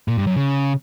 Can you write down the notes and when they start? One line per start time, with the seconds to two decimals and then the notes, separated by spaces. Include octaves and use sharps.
0.08 A#2
0.17 G2
0.27 F#2
0.37 C#3